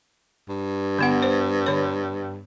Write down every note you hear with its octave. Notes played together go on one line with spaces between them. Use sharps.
G2
D3 B3 F#5
C5
D3 C#5